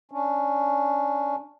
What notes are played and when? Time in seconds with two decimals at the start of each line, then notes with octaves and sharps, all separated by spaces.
0.11 C#4 D4